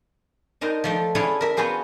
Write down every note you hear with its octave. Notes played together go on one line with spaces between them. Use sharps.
D4 D#4 A#4 C5
F3 A3 D4
C#4 D4 E4 G#4 A4 C#5
A#4 E5
B3 F4 F#4 G#4 C5